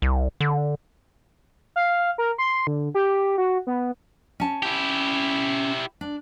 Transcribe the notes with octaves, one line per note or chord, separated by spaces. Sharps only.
C2
D3
F5
A#4
C6
D3
G4
F#4
B3
C#4 A5
E4 G4
D4